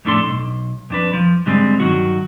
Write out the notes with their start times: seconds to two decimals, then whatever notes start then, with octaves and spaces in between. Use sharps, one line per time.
0.05 F2 A2 A3 D4 A4 C6
0.27 B1
0.90 F2 D4 B4
1.13 F3
1.46 G#2 D3 G3 G#3 C4
1.80 G2 D#3 F#3 F#4